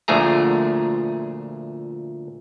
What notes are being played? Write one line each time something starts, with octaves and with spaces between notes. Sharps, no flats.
D2 A#2 F3 A3 G#4 A#5